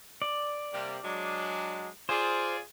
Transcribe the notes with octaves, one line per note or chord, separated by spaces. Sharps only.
D5
C3 G3 A#3
F#3 G#3 D4
F4 G#4 C5 D5